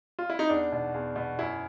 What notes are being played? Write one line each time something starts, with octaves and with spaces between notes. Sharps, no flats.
F4
E4
D#4
E2 D4
B2
E2
B2
F#2 E4